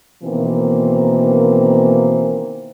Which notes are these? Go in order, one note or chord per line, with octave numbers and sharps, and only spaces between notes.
B2 D#3 E3 A#3 C4